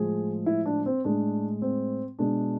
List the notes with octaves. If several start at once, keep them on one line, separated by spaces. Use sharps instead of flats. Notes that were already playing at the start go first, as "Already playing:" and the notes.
Already playing: A2 F3 G#3 G#4
E4
D4
C4
A2 G#3 D4
C4
B2 G#3 D4